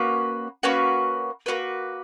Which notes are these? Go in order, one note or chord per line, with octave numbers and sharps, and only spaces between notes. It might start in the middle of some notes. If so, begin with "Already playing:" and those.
Already playing: A#3 C#4 F#4 B4
A#3 C#4 F#4 B4
A#3 C#4 F#4 B4